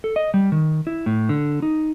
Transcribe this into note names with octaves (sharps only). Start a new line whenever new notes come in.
A4
D#5
G3
D#3
E4
A2
D3
D#4